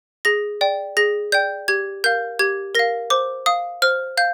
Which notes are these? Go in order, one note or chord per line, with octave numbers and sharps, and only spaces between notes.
G#4 A#6
D5 G5
G#4 A#6
D5 G5 G6
G4 G#6
A#4 F5 G6
G4 G#6
A#4 F5 A#6
C5 D6
F5 D#6
C5 F6
F5 G6